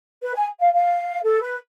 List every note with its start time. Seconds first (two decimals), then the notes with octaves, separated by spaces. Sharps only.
0.21 B4
0.34 G#5
0.59 F5
0.73 F5
1.23 A4
1.41 B4